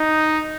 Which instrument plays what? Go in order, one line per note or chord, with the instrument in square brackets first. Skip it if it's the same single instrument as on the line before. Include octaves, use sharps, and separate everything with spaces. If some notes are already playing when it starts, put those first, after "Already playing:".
Already playing: [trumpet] D#4